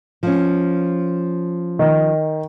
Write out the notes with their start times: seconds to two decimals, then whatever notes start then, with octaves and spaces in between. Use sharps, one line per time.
0.23 F3 C#4
1.79 D#3